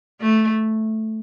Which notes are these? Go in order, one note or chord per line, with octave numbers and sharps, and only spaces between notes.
A3